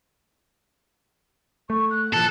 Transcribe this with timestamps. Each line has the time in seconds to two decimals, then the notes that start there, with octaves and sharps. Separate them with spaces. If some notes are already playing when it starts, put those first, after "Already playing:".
1.70 A3 C#6
1.91 F#6
2.13 A#2 E3 F3 A4